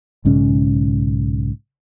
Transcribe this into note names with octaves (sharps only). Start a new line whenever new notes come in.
B1 G#2 C#3 C#4